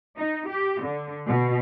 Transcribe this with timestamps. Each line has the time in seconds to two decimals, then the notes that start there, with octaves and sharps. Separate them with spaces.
0.17 D#4
0.48 G4
0.82 D3
1.26 B2